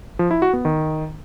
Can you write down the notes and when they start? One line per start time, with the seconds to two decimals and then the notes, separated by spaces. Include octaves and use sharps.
0.19 F3
0.31 E4
0.42 F#4
0.53 B3
0.65 D#3